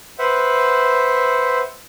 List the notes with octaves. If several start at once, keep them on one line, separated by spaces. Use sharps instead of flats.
B4 C5 E5 F#5